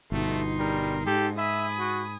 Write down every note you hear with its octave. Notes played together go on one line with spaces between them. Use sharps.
G1 B2 A3 D#4 C6
G3 A#4
G#2 G4 A4
E5 G#5 B5 D#6
F#4